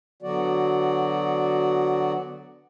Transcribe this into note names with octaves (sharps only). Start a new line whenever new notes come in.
D3 F#3 B3 F#4 D5